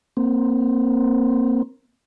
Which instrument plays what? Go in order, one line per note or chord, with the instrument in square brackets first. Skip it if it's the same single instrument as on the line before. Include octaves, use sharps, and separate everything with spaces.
[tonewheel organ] A#3 C4